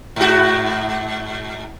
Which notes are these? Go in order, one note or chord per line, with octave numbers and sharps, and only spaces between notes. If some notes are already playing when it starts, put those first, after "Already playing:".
G#2 F#4